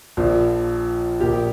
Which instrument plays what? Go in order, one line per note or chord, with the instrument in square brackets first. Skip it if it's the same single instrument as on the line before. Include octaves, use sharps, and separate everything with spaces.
[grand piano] A#1 A#2 F3
A#1 A#2 A#3 G4